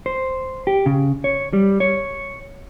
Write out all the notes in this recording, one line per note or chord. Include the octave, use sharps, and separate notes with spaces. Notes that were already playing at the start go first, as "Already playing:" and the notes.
C5
G4
C#3
C#5
G3
C#5